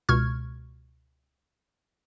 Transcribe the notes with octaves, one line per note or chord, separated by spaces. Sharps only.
C#2 B2 C#6 F6 G#6